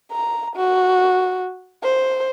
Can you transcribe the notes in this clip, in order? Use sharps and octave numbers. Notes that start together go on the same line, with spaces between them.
A#5
F#4
C5